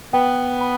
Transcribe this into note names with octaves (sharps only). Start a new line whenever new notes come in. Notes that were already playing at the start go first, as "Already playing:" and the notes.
B3 G5
B5